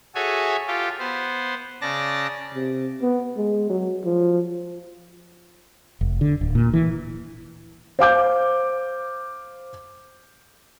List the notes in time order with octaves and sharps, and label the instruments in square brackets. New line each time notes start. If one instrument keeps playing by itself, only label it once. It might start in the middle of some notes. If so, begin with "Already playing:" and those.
[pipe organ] F#4 G#4 A4 C#5 E5 G#5
F4 G4 A4
B3 C5
C#3 D5 A5 A#6
[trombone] C3
B3
G#3
F#3
F3
[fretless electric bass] F1
D3
D1
A#2
E3
[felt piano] C5 F5 D6 G6